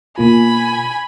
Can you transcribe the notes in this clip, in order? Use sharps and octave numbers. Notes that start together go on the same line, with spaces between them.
B2 A#3 F4 G#5 B5